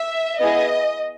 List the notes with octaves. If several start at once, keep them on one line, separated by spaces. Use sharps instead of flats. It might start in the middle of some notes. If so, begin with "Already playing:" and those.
Already playing: E5
B3 E4 G#4 D#5